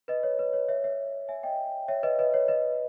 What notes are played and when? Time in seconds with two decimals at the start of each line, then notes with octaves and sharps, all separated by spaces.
0.08 B4 D#5
0.23 C#5
0.39 B4
0.53 C#5
0.68 C#5 E5
0.84 C#5 E5
1.28 E5 G#5
1.43 D#5 G5
1.88 C#5 E5
2.03 B4 D#5
2.19 B4 D#5
2.34 C#5
2.48 B4 D#5